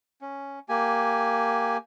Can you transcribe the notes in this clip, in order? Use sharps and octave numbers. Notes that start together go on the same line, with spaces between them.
C#4
A#3 G4 G#5